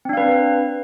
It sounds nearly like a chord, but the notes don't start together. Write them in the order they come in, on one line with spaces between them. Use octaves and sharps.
C4 D4 F5 B4